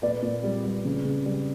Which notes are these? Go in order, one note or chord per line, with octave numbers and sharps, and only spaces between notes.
A#2 B4 D5
A#2
G3
G3
C#3
C#3
G3